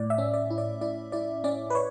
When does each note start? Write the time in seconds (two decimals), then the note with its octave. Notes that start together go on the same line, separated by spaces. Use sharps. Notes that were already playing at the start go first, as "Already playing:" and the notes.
Already playing: A2 D5
0.10 E5
0.18 C#4
0.34 D5
0.50 E4
0.58 D5
0.81 E4 D5
1.12 E4 D5
1.44 C#4 D5
1.70 B4
1.75 C#5